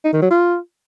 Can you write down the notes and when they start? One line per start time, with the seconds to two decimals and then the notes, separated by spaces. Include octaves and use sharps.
0.04 D#4
0.13 D#3
0.22 F#3
0.30 F4